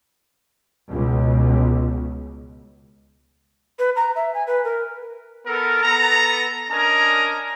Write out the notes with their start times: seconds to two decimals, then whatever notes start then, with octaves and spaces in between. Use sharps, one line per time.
0.90 C#2 B2
3.79 B4
3.96 A#5
4.16 E5
4.34 G#5
4.47 B4
4.64 A#4
5.45 B3 A4 A#4
5.83 B3 A4 A#5
6.70 C#4 D4 A#4 D#5 G#5 A#5